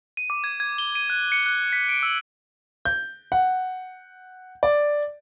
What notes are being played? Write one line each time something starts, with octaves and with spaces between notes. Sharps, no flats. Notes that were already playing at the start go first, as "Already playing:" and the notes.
D#7
D6
G#6
G#6
G7
D#7
F#6
C#7
F#6
B6
D7
E6
G6
F#5
D5